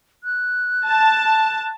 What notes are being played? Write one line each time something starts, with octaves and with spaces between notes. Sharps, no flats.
F#6
A5